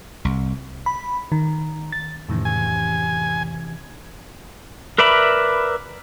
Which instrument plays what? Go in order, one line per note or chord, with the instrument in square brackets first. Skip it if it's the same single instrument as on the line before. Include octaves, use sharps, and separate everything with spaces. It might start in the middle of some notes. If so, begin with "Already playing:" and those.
[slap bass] C2
[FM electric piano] B5
D#3
A6
[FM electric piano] F2 A2 D#3 [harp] C3 E3 C#4
[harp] C3 [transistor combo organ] G#5
[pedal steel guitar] A#4 B4 D5 E5 B5